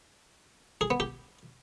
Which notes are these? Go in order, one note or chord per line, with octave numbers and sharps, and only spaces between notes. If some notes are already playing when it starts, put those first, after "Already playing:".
G#4
B3
G4